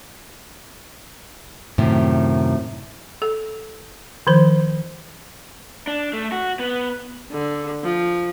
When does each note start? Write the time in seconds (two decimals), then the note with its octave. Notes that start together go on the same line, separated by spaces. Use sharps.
1.78 F#2 A2 C3 D#3
3.22 A4
4.27 D#3 F3 C5
5.87 D4
6.13 A3
6.32 F#4
6.59 B3
7.32 D3
7.84 F3